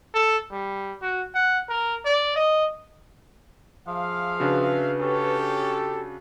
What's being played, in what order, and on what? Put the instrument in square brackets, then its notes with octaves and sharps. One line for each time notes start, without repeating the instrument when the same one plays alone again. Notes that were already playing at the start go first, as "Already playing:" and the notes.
[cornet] A4
G3
F#4
F#5
A#4
D5
D#5
[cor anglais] F3 [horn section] G#4 E5 F5
[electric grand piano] C#3 D4 F#4 [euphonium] B4
[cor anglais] C#4 [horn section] G4 A4